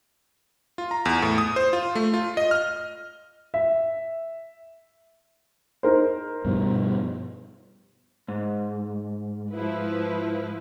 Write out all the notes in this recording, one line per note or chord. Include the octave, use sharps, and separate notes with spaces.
F4
A#5
E2
A2
D#6
C5
F4
A3
F4
D#5
F6
E5
D#4 A#4 C5
G2 B2 F3
G#2
F3 E4 B4